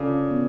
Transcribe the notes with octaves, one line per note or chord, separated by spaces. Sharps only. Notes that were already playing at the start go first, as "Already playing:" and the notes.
Already playing: C#3 D4 F4 A4 D5
B3